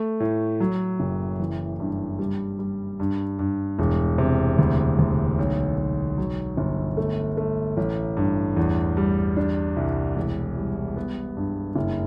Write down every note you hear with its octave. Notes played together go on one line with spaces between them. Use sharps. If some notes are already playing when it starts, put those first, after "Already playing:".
Already playing: A3
A2
F#3
F#1
E3
G2
G3
G3
G2
G2
E1
C3
D2
D2
B1
B1
F#3
G1
A3
A3
A1
G2
E2
G3
D4
C2
E1
G3
B3
G2
F#1